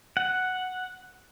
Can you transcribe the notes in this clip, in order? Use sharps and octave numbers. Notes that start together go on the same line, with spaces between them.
F#5